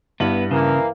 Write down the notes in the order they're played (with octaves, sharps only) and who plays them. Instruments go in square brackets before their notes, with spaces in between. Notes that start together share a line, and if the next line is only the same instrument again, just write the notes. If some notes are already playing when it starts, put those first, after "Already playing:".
[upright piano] G2 E4 F#7 [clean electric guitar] B3
[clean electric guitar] C#3 [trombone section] E3 A#3